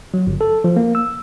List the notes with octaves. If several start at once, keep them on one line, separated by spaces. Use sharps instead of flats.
F#3
G1
A4
F3
A#3
E6